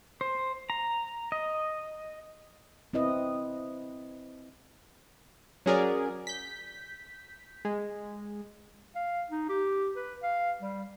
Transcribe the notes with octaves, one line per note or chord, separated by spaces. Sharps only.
C5
A#5
D#5
C4 E4 B4 D#5
F#3 C#4 G#4 A#4 D5
G6 B6
G#3
F5
D#4
G4
B4
F5
G3